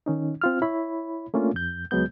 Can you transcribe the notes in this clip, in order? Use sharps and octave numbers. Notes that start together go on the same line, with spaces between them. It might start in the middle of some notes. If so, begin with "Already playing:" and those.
D#3 C#4 D#4
C4 F4 F6
E4 C#5 B5
A3 A#3 C#4 D4 F4
F2 G6
C#2 F#3 G#3 B3 G6